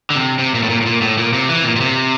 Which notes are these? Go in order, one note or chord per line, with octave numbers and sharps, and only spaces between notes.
D3
C3
C3
A#2
A2
A#2
A2
A#2
A2
A#2
C3
E3
A#2
A#2
C3